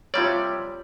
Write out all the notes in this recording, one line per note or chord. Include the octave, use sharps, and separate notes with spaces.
C3 G3 F4 C#5 D5